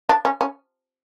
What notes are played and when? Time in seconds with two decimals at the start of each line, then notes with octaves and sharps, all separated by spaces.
0.09 D4
0.25 C#4
0.41 C#4